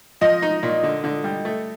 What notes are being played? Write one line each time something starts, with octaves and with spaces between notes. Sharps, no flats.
F3 D#5
D#4
A#2
D3
D3
G3
A3